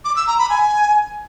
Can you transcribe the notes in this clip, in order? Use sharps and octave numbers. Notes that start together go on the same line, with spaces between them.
D6
E6
A#5
B5
G#5